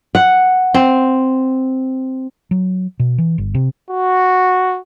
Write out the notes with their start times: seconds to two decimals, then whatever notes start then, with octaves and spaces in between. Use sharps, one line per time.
0.15 F#5
0.74 C4
2.51 F#3
3.00 B2
3.18 E3
3.38 G1
3.54 C3
3.91 F#4